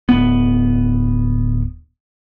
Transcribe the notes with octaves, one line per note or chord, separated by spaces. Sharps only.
D1 B3